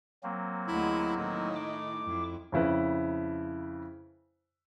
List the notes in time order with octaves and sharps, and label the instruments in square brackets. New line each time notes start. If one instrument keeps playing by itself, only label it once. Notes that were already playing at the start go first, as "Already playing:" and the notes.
[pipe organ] F#3 A#3 C4
[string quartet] D2 G#3 F#5 [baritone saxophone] E4
[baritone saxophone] A2 [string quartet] D#3 D#4 E4
[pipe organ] D6
[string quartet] F2 E4
[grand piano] F2 C#3 E4 B4